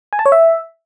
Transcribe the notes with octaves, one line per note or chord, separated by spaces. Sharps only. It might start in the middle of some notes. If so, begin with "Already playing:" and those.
G#5
A5
C#5
E5